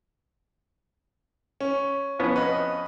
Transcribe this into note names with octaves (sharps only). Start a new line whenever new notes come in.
C#4
F2 B3 C#4
B4 D#5